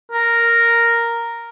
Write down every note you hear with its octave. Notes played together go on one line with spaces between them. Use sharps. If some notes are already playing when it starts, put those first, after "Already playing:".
A#4